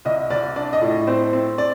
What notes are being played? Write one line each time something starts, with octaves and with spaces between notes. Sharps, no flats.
C2 D#5
C2 D5
D4 D5
D#5
A2
D#5
C4 C5
C4
D5